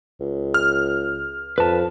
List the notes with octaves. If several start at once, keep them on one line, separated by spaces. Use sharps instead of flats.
C#2
F6
F2 B4 A5